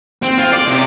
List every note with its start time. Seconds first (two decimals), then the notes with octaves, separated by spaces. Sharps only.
0.23 C4
0.38 F4
0.53 D5
0.68 C3